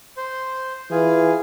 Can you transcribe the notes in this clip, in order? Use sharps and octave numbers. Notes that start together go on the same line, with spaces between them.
C5
E3 F4 G#4